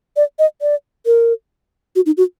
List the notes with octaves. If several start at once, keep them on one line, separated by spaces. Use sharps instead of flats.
D5
D#5
D5
A#4
F#4
D#4
F#4